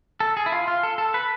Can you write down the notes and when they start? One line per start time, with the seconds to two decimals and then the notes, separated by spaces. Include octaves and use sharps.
0.20 A4
0.37 G#4
0.46 E4
0.52 F4
0.68 F4
0.83 A4
0.98 A4
1.14 B4